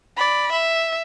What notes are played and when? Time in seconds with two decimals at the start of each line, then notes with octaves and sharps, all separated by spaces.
0.17 D5 B5
0.52 E5